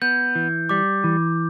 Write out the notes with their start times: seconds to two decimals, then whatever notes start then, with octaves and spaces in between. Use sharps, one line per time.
0.02 B3 G6
0.35 E3
0.69 G3 D6
1.04 E3